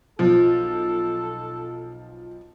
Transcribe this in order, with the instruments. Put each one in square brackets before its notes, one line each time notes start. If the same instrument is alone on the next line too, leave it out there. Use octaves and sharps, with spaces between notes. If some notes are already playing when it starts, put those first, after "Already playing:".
[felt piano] B1 [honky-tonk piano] F3 [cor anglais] A4